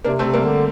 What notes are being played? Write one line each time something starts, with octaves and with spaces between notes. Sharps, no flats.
C3 A#3 D4
A3 C4
C3
G3 A#3
D3